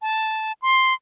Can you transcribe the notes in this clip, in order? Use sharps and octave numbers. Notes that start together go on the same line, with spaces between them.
A5
C6